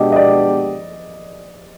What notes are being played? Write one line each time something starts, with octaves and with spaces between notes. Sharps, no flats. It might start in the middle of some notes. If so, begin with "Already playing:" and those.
Already playing: B2 G#3 B3 D4 G4 D#5
D#5
D5